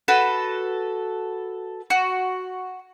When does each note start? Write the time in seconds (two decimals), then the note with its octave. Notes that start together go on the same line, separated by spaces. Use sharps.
0.08 F#4 A4 B4
1.90 F#4